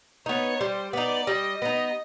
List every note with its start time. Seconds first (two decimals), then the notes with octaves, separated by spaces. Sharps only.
0.26 B3 D#4 C#5
0.60 G3 C5
0.93 B3 D#4 D5
1.27 G3 D#5
1.61 B3 D#4 D#5